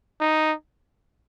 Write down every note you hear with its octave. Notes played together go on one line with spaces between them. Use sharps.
D#4